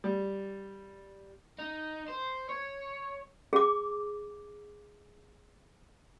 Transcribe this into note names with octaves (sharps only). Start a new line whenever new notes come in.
G3
D#4
C5
C#5
G#4 D6